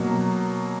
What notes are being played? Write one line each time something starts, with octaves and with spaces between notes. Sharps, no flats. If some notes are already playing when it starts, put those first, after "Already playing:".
Already playing: B2 F#3 A#3